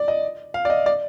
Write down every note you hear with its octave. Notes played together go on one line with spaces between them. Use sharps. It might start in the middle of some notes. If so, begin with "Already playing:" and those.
Already playing: D5
D#5
F5
D5
D#5
D5